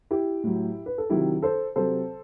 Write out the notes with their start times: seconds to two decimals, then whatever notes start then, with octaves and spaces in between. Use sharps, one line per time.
0.11 E4 G4
0.44 A2 F#3
0.86 B4
0.98 A4
1.10 C3 D#3 F#3 E4 G4
1.42 A4 C5
1.76 C3 F#3 A4 C5